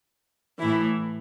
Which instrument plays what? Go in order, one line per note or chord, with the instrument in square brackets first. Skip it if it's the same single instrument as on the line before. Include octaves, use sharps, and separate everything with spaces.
[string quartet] A2 E3 E4